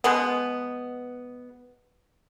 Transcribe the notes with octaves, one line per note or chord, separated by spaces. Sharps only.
B2 G#3 B3